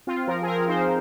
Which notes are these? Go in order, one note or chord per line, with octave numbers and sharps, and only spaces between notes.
C4 F4
F3 A#4
G#4
C4 A#4
D#4 C5